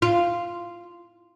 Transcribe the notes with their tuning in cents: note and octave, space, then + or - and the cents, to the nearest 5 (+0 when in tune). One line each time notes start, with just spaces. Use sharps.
F4 -10